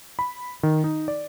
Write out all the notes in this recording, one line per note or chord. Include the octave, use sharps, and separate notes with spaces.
B5
D#3
D#4
D5